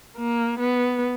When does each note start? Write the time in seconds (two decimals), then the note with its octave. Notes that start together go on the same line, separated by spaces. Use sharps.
0.18 A#3
0.60 B3